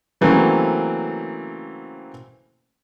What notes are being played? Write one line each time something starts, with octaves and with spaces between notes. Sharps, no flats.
C#3 E3 F#3 A3 A#3 C4